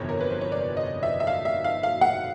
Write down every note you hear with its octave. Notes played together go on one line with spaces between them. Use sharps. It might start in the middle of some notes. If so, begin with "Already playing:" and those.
Already playing: G1 F2 C3 E3 C#5
A#4
B4
C5
C#5
D5
D#5
E5
E5
F5
E5
F5
F5
F#5